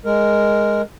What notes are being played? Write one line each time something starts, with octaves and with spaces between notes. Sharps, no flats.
G#3 A#4